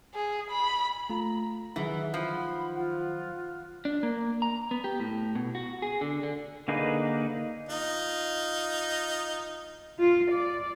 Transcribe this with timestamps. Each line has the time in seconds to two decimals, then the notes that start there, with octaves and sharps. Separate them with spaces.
0.14 G#4
0.51 B5
1.09 A3 F4 A#5
1.76 D#3 E3 F#3 D#4 G#4 F#5
2.14 F3 B5
2.77 F4 F#5
3.85 D4
4.03 A#3
4.42 A#5
4.71 B3
4.84 G4
5.00 A2
5.35 B2
5.55 F#4
5.82 G#4
6.01 D3
6.23 D3
6.68 D3 A#3 D#4 G#4 B4
7.69 D#4 F4
9.99 F4
10.32 D5